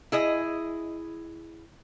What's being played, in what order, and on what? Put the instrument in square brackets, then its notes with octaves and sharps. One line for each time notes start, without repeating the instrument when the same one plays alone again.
[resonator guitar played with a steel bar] E4 G#4 D#5